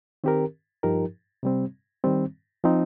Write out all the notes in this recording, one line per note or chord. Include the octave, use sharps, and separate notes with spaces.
D#3 C4 G4 A#4
G2 F3 D#4 G4 A#4
C3 G3 C4
D#3 G3 C4
F3 C4 D#4